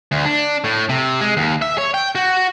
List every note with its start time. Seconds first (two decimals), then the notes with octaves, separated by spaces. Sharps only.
0.12 D2
0.25 D4
0.64 A2
0.89 C3
1.21 G#3
1.37 D#2
1.62 E5
1.78 C#5
1.94 G5
2.15 F#4